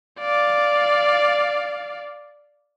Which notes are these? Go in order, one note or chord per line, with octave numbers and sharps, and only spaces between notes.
D5 F5